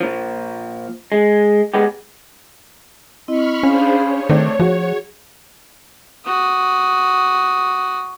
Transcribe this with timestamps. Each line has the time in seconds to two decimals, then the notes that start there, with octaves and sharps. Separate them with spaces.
0.01 A#2 F3
1.12 G#3
1.74 G#3 B3 G4
3.28 C4 E4 D#5 B5 C#6 F6
3.63 C#4 D4 G#4 C5 F5 B5
3.95 C#5
4.29 D#3 A3 C4 D4
4.60 F3 F#4 G#4
6.26 F#4 D#6